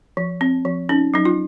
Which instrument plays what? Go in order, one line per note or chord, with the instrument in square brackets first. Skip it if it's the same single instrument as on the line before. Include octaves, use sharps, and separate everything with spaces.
[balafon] F3
C4
F3
C#4 D#4
F#3 D#4
F4